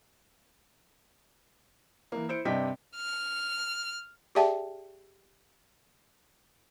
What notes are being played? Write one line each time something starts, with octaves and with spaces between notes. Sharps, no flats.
E3 A#3
E4 C5 C#7 D7
G2 C3 D4 D#5 G5 B6
F6
G4 G#4 D5 E5 G5 A5